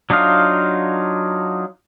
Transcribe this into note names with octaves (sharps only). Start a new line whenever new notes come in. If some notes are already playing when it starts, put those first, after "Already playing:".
F#3 D4 D#4 F4 F5